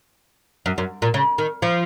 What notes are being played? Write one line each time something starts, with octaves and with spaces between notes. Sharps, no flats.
F#2
F#2
A#2
C#3
D#3
F3